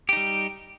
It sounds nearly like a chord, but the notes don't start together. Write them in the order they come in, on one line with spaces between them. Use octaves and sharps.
G4 D#4 G3